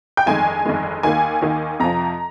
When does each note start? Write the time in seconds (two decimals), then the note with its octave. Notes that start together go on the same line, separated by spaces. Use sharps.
0.17 G5
0.26 G1 F2 D#3 G#3 G#5
0.65 G1 F2 D#3 G#3
1.03 D#2 D#3 A#3 G#5
1.41 D#2 D#3 A#3
1.79 F2 C3 F3 A#5